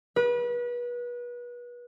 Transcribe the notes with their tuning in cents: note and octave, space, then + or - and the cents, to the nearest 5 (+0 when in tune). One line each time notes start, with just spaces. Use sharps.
B4 -30